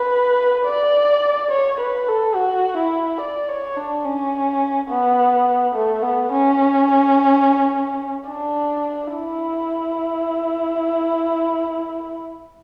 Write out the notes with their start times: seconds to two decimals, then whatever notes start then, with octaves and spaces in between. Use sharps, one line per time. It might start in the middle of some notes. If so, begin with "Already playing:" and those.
Already playing: B4
0.66 D5
1.51 C#5
1.80 B4
2.08 A4
2.35 F#4
2.78 E4
3.20 D5
3.48 C#5
3.77 D4
4.05 C#4
4.90 B3
5.75 A3
6.03 B3
6.32 C#4
8.29 D4
9.15 E4